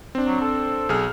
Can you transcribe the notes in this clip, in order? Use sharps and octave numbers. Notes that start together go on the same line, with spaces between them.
C4 D4
F#3
A4
B1 G#4 F6